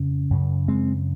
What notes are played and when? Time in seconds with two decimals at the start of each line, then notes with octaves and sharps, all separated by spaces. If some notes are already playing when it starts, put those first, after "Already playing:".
Already playing: F2 C#3
0.30 F#2 C#3
0.68 G#3 C4